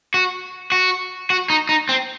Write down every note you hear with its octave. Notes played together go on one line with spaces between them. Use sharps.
F#4
F#4
F#4
D#4
D#4
C4